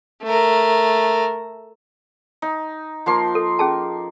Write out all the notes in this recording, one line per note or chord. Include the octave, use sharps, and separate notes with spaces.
A3 A#4
D#4
F3 A#3 C6
A4
C#4 G#4 A5